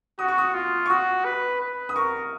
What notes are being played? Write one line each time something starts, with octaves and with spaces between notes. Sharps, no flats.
F#4 D#6
C#6
D#6
F4
C#6
F#4 D#6
B4
B4
D#6
A#4 C#6